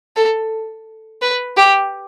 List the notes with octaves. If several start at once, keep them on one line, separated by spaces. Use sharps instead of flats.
A4
B4
G4